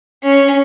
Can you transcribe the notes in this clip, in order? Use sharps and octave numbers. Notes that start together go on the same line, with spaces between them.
C#4